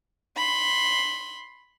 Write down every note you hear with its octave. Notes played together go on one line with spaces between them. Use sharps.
B5 C6